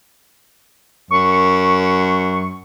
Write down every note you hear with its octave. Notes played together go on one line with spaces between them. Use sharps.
F#2 C#6